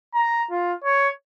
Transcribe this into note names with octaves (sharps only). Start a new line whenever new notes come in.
A#5
F4
C#5